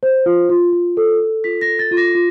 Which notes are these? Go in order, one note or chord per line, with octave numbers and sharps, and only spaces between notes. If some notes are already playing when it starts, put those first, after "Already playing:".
C5
F4
F4
F4
A4
A4
F4 B6
A#6
A4
A6
F4
A#6
F4